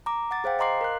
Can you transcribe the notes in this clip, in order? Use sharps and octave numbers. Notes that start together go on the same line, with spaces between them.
A#5 D6
F#5 D6 A6
G#4 C5 F5 G5
D#5 F5 A#5 C6 D6 C7
A#4 F#6